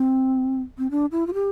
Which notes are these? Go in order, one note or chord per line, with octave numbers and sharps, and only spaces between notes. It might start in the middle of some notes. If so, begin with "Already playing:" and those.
Already playing: C4
C4
D4
E4
F4
G4